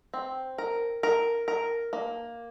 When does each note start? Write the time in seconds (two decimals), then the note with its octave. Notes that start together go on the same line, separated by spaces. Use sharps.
0.14 C4
0.58 A#4
1.03 A#4
1.48 A#4
1.93 A#3